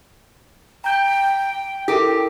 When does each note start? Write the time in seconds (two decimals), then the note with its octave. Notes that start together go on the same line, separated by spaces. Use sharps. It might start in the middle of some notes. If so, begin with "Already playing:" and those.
0.84 G5 A#5 G6
1.88 E4 G4 A4 A#4